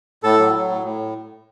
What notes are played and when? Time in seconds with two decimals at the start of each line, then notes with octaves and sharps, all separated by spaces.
0.23 A2 A4
0.39 F#3
0.53 F#3
0.68 A2
0.83 A2